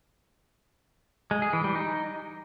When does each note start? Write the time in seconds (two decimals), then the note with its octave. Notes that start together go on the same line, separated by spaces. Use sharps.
1.31 G#3
1.42 G#4
1.53 E3
1.64 G3
1.75 D#4